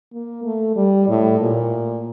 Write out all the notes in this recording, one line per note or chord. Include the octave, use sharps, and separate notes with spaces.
A#3
A3
G3
A2
A#2